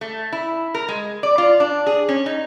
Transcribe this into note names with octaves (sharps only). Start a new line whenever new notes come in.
A3
E4
A#4
G#3
D5
F4
D4
G#4
C#4
D#4